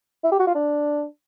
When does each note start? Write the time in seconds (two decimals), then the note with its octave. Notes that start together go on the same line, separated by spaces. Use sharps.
0.24 E4
0.31 G4
0.39 F#4
0.47 F4
0.55 D4